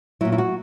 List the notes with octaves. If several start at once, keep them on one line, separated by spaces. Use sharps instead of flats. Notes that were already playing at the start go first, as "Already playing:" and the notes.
A#2 F#3 E4
E4
F#4